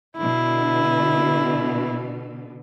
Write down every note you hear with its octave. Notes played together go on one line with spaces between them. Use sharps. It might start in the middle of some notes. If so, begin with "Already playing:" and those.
B2 D3 E4